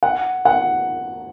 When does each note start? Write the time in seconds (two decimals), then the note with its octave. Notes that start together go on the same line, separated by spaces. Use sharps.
0.03 F#5
0.45 F#5